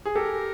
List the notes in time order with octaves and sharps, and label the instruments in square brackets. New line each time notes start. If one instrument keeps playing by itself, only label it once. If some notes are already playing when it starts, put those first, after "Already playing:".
[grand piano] G#4
[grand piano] G4 A4 [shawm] A#4